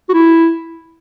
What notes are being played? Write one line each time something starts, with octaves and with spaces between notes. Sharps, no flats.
F#4
E4